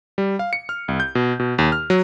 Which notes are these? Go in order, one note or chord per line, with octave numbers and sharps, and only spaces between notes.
G3
F5
C#7
F6
C2
G6
B2
B2
D#2
F6
F#3